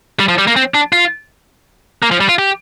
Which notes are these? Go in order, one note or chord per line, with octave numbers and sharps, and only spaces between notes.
G3
F3
G3
A#3
C4
D4
F4
A#3
F3
G3
F4
G4